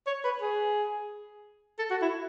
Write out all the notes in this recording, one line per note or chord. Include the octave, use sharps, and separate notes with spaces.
C#5
B4
G#4
A4
F#4
E4